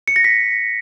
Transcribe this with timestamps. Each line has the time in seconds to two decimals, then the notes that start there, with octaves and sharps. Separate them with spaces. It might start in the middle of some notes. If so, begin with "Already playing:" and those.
0.08 C#7
0.16 A#6
0.24 B6